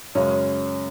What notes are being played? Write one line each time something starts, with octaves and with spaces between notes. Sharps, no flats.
F#2 C#3 G#3 C#4